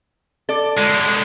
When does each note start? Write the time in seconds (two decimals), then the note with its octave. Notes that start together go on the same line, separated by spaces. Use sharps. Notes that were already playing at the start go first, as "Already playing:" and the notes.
0.49 A4 D5
0.77 D3 G#3